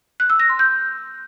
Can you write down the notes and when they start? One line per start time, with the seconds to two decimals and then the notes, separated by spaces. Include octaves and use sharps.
0.20 F#6
0.30 E6
0.40 A#6
0.49 C6
0.59 G6